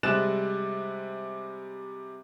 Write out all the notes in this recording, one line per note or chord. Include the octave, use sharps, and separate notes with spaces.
C3 G3 G#3 F#6 A6 E7